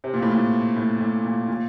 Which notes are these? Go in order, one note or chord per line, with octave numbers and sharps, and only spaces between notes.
C3
A#2
A2
A#2
A2
A2
A#2
A#2